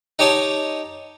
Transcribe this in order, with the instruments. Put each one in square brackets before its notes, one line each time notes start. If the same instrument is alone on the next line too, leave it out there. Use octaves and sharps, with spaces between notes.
[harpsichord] D#4 G4 C#5 D#5 A5